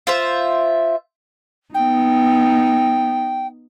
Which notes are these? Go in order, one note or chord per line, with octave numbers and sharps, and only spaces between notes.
F4 C5 E5
B3 D#4 G5